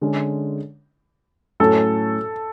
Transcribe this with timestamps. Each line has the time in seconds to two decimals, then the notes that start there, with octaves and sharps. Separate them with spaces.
0.01 D3 G#3 C#4
1.60 A2 F#3 C#4 F#4 A4